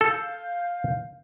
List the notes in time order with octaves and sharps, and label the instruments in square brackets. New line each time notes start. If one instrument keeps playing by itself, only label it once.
[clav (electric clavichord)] A4 [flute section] F5 G6